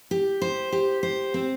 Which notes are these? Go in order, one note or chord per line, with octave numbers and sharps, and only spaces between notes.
G4
C5
G4
C5
C4